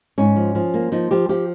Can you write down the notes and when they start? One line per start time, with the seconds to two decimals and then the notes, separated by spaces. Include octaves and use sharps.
0.18 G#2 C#4
0.36 F3
0.55 F3
0.74 A#3
0.92 F3 D#4
1.11 F3 G4
1.29 F3 G4